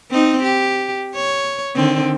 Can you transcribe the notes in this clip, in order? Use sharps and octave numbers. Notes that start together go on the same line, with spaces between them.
C4 D#4
G4
C#5
D3 D#3 C4